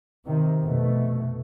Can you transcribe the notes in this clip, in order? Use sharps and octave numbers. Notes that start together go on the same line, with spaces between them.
C3 D#3
F1 B2 A3